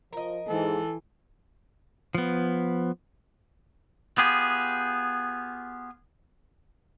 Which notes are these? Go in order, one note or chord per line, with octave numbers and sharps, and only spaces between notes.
F3 A#4 D#5
G#2 E3 A4
F3 B3
B3 F4 G4 G#4